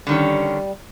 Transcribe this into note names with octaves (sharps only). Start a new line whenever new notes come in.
D3 D#3 G3 C#4